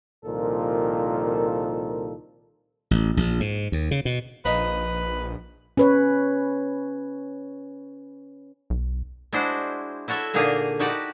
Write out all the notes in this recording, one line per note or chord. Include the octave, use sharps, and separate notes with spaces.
C2 A#2 D#3 F3 A4 A#4
A1
A#1
G#2
D#2
C#3
B2
A#1 F3 D#4 B4 D#5
C#4 B4 C#5
B1
G#3 D4 E4 F#4 C5
E4 F#4 A4 C#5 E5
A#2 D3 A#3 D#4 G#4 A#4
D#4 E4 F#4 G4 F#5 A5